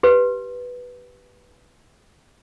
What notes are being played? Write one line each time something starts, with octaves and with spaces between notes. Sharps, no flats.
G4 B4